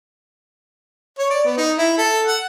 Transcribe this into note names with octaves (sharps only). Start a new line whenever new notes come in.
C#5
D5
B3
D#4
E4
A4
F#5